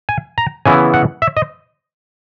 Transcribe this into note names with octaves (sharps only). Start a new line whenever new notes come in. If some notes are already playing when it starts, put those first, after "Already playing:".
G#5
A#5
C#3 E3 B3 E4 G#5
F#5
E5
D#5